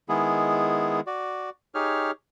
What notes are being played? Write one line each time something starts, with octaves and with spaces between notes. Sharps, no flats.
D#3 G#3 B3 E4 G#4
F#4 D5
D#4 G4 G#4 C#5 F6